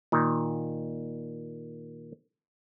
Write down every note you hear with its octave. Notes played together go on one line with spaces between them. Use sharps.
A#2 D#3